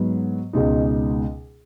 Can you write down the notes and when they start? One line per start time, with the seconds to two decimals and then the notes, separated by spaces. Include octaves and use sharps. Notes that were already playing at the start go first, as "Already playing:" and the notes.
Already playing: G#2 F#3 B3
0.53 C#2 B2 G#3 D#4